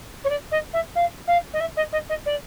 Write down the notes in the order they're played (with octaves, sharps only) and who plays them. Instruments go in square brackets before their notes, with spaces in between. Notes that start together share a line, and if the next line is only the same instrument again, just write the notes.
[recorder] C#5
D5
D#5
E5
F5
F5
D#5
E5
D#5
D#5
D#5
D5